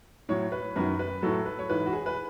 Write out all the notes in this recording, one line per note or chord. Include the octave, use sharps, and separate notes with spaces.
A2 F#3 C#5
B4
F#2 D#3 F#3 B4
B4
A2 F#3 A4
B4
C#5
G#2 E3 B4
F#4
G#4
B4